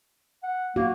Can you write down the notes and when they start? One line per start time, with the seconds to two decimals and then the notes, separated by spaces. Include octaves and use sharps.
0.43 F#5
0.76 A#3 F#4